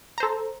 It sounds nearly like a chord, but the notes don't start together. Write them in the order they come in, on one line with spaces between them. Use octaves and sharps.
A#5 C5 A4